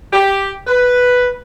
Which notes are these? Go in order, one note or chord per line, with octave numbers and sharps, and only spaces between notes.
G4
B4